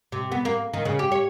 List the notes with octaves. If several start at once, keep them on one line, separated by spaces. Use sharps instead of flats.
C3
B3
A#3
D#3
C#3
G4
C#5